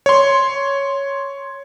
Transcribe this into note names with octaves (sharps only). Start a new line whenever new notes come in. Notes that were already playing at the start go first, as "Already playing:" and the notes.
C#5 C6